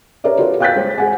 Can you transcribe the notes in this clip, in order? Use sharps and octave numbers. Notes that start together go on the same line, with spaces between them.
G4 A#4 B4 C#5 D5 E5
F4 F#4 A4 B4 C#5 D#5
F5 G5 F#6 G6 A6 B6
G#3 C5
G#4 F#5 G#5